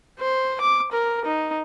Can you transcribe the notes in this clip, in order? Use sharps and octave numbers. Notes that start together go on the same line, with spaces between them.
C5
D6
A#4
D#4